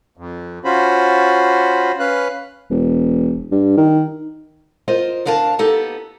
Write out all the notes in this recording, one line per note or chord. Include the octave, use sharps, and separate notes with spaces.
F2
C#4 F4 F#4 C5 B5
C#4 B4 F5 F#6
E1
G2
D#3
F4 A#4 C5 D#5
D2 D4 A#4 F5 G#5 A5
A#3 B3 D#4 G4 A4